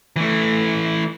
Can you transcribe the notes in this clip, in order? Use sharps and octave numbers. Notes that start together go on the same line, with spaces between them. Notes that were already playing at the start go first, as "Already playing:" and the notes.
E3 A3